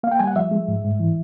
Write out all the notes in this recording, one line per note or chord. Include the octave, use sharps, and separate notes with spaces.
A#3 F5
G5
G3 G#5
F#5
F3 E5
G#3
G#2
G#2
E3